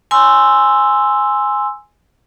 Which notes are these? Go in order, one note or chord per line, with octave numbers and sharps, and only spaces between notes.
G#5 C6 E6